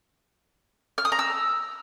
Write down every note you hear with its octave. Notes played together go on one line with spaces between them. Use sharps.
F6
D#6
A#5
E6